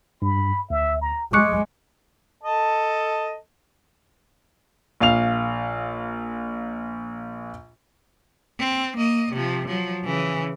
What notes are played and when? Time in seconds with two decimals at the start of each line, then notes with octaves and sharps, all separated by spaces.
0.22 G2 B5
0.70 D2 E5
1.01 A#5
1.33 G#3 G#4 C#6 D6 F#6 C#7
2.44 A4 D#5 A5
5.00 A#1 F5 F7
8.59 C4
8.97 A#3 D#5
9.33 C3 F3
9.67 F3 F#3
10.05 C#3 E3